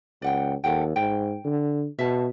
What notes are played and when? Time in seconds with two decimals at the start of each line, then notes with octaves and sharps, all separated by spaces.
0.22 C#2 D5 F#5 G5
0.64 D#2 A4 F#5 G5
0.96 G#2 G5
1.45 D3
1.99 B2 E5 A5